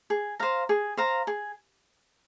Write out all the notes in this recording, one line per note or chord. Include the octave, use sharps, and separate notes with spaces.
G#4
C5 F5 A#5
G#4
C5 F5 A#5
G#4